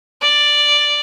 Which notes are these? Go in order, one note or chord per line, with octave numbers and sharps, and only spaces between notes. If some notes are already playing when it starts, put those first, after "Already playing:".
D5